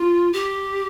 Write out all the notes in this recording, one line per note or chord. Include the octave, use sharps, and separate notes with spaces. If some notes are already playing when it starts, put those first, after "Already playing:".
Already playing: F4
G4